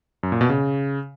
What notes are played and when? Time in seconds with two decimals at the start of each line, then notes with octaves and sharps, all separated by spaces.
0.23 F#2
0.32 A#2
0.41 B2
0.49 C#3